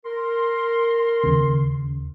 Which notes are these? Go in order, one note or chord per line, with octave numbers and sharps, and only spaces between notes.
A#4 C6
D#2 C#3